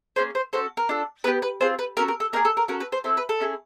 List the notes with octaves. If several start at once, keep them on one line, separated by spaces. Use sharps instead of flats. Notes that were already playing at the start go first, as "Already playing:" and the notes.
A#3 C#4 G#4 C5
C5
C#4 F#4 A4 C5
A#4
D4 F4 A4
B3 D#4 G4 B4
B4
C4 F4 G#4 C5
B4
C#4 F#4 A4 A#4
A#4
A4
A#3 D#4 G#4 A#4
A4
A#4
C#4 F#4 A4 A#4
B4
C5
C4 E4 A4 C5
B4
A4
C#4 E4 G#4